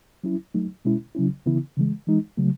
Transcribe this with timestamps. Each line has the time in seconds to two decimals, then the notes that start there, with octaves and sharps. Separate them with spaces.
0.24 F#3 C#4 E4
0.54 F#3 A3 D#4
0.85 B2 G#3 C#4 E4
1.15 C#3 F#3 C#4 E4
1.46 C#3 E3 B3 E4
1.77 C#3 E3 G#3
2.07 E3 G#3 D#4
2.37 C#3 F#3 A3